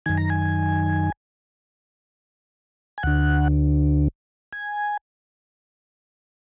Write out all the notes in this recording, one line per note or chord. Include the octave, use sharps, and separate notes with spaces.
F#2 D#3 G#5
A#5
G#5
G#5
D2 D3 F#5
G#5